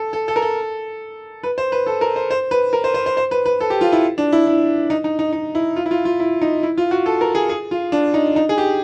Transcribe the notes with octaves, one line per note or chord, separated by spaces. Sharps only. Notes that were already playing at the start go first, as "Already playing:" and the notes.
Already playing: A4
A4
A4
A#4
A4
B4
C5
B4
A4
A#4
C5
C5
B4
A#4
C5
C5
C5
C5
B4
B4
A4
G4
F4
E4
D4
E4
E4
D#4
D#4
D#4
D#4
E4
F4
E4
F4
F4
E4
D#4
E4
F4
F#4
A4
A#4
G#4
G#4
F4
D4
D#4
D#4
G#4
G4